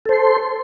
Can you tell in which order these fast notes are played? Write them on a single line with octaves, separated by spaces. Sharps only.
A4 C5 C6